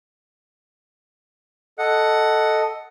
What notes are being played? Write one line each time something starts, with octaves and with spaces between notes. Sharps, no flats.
A4 D#5 F#5